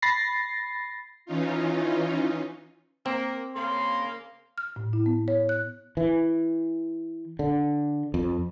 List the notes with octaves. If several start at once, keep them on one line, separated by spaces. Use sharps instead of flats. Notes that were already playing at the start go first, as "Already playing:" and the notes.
B5 A6 A#6 C7
E3 C#4 D#4 F4
A#3 C4
C#3 A#3 C6
F6
A2
E4
B3
C#5
F#6
E3
D3
F2